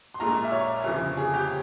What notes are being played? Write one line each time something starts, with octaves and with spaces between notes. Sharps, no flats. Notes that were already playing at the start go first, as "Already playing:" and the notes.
C6
A#1 A#2 G#3 A#5
E5
C#5
G1 F2 C#3 F3
G#4
G4